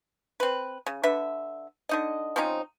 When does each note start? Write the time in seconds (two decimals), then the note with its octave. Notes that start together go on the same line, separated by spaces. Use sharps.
0.40 C4 B4
0.86 C#3
1.03 D3 D4 B4 E5
1.89 D3 D#4 D#5
2.36 F3 C4 C#4 D#4